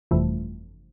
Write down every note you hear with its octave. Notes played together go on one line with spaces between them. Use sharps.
G1 F2 C3 E3 A3